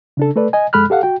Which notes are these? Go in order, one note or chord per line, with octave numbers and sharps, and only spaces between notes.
C#3 D4 A4
A3 A4 B4 D5
D#5 G#5
F2 G#3 A4 B5 F6 F#6
G4 A4 F5 F#5
F#4 G5